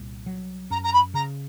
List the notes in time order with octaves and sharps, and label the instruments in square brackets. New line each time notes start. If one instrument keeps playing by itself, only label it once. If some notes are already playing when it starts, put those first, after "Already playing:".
Already playing: [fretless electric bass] C2 A#2
F#3
[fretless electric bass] F#2 [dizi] A#5
[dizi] A#5
B5
[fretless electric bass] C#3 [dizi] A#5